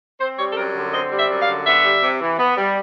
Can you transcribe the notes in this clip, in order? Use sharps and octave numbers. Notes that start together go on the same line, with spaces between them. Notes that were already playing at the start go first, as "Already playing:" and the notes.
C4 C5
G3 C#5
A4
F#2 A#4
D3
C4 D#5
G3
E5
F#2
F5
D3
B3 E5
G3
C3
E3
B3
G3